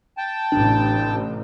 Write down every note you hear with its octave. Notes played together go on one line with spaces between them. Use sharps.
G5 A5
A1 C3 D4